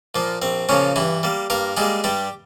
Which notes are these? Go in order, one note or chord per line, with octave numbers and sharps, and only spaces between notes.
A#2 F3 A#3
A#1 C4
A#2 C#3 F3 A#3 C#4
G2 E3 E4
G3 A#3
G2 A#3 A#4
G3 G#3 A#3 G#4
G2 G3 G4